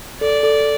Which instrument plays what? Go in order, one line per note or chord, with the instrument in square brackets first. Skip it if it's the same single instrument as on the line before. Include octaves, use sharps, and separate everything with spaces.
[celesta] A4 [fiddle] D5
[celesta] A4